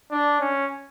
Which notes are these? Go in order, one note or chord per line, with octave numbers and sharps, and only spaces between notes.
D4
C#4